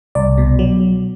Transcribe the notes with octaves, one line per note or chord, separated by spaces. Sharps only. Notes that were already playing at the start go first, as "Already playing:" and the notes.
C2 D5
B2
F#3